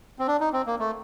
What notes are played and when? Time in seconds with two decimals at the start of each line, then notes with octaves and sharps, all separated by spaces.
0.19 C4
0.28 D4
0.40 D#4
0.53 C4
0.66 A#3
0.79 A3